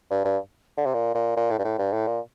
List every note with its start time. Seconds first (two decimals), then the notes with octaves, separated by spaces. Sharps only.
0.11 G2
0.25 G2
0.78 D3
0.86 C3
0.94 A#2
1.15 A#2
1.37 A#2
1.50 A2
1.59 G2
1.65 A2
1.78 G2
1.93 A2
2.07 A#2